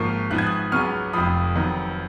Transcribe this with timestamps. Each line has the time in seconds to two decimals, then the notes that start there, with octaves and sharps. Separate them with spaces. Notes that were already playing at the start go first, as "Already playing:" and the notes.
Already playing: G#1 G#2 F3 A#3 C#6 F6
0.30 G#1 G#2 F3 B3 F#6
0.38 G#6
0.46 D#6 F#6
0.72 C#2 C#3 F#3 B3 C#6 F6
1.13 F1 F2 F3 B5 D#6
1.55 F2 D#3 F#3 B3